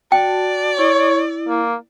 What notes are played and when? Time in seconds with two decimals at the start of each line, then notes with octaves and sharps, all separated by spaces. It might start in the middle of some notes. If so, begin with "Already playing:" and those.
0.12 F#4 D5 G5 A5
0.78 E4 C#5
1.48 A#3